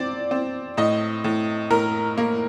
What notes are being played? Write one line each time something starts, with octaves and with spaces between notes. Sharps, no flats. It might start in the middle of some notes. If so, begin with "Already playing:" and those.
Already playing: C4 D5
C4
A2 D#5
A2
A2 A#4
A#3